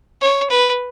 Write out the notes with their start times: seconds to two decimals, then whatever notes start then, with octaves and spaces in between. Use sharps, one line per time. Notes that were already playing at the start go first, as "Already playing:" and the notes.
0.21 C#5
0.50 B4